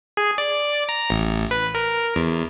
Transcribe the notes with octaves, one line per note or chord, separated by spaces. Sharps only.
G#4
D5
A#5
A1
B4
A#4
E2